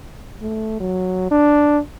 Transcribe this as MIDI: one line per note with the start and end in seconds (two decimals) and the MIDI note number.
0.42 0.80 57
0.81 1.30 54
1.31 1.80 62